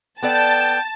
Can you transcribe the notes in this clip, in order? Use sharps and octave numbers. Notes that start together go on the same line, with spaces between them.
B3 A4 D5 G5 A5